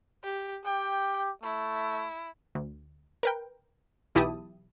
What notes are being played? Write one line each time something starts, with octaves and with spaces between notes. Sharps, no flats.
G4
G4 G5
A3 E4
D2
A#4 B4 G5
B1 E3 E4 G4 A5 D#6